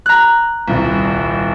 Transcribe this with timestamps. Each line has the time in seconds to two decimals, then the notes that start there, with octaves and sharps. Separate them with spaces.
0.06 A#5 F#6
0.68 D#1 C2